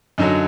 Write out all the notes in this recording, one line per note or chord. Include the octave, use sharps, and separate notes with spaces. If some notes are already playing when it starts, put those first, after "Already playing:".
F#2 D3 F#3 D#4